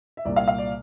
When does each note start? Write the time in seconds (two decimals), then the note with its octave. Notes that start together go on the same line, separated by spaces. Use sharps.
0.17 E5
0.25 C2 A#2 G3 A#3 D5
0.36 F5
0.48 F5
0.58 D5